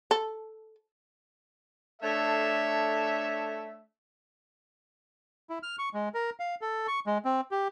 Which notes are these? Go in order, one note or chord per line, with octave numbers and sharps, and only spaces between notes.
A4
A3 D4 A4 C#5 E5
E4
F6
C#6
G#3
A#4
F5
A4
C#6
G#3
C4
G4